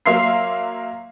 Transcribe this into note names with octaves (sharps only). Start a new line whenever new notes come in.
F#3 A#3 E5 F5 C6 C7